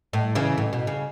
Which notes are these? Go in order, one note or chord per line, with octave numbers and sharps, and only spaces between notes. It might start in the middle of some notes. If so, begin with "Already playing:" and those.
A2
C#3 E3
A2
B2
C#3